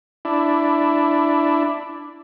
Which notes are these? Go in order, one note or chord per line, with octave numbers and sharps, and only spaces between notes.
D4 E4